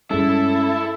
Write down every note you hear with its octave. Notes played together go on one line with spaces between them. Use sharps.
G2 G#3 C#4 E4 A4